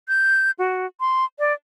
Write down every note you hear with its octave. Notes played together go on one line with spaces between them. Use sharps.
G6
F#4
C6
D5